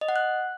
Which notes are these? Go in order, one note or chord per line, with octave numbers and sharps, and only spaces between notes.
D#5
F#5
F#6